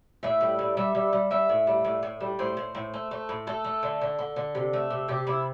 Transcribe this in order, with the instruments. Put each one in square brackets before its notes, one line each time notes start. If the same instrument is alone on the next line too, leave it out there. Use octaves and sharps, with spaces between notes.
[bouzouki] A2 E5
G3
A2
G3 E5
G3
G3
G3 E5
A2
G3
A2
A2
G3
A2 C5
A2
A2
A3
A3
A2
A3 A4
A3
D3
D3
D3
D3
C3
A3
C3
C3 G4
C3 E4